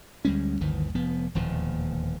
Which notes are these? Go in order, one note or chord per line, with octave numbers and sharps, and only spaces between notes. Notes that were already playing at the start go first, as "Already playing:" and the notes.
D2 G3 G#3 C#4
G1 D2 D#3 E3
F1 F3 B3
E1 D#2 A#2 F3